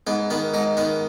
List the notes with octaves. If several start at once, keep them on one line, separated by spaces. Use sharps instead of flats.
G#2 B3
D#3 B3
G#2 D#4
D#3 B3